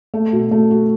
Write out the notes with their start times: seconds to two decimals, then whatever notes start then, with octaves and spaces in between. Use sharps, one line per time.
0.14 A3
0.33 B2
0.51 A3
0.71 F#4